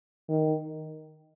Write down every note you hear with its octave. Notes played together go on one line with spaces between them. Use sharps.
D#3